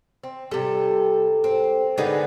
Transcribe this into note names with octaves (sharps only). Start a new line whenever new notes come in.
C4
C3 G3 A4
C4
D3 B3 D#4 G#4 B4